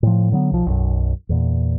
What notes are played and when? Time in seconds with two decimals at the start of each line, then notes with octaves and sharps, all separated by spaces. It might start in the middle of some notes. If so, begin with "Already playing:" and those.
0.03 A2 F3
0.32 D3 F#3 G#3 B3
0.52 B1 F3
0.66 B1 F#2
1.29 E2 A#2